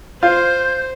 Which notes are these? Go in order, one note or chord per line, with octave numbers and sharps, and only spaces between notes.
F4 C5 G6